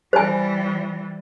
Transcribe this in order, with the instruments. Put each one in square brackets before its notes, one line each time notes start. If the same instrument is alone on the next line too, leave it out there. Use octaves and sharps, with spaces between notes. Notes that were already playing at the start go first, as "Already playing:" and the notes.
[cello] E3 G3 [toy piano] C5 G#5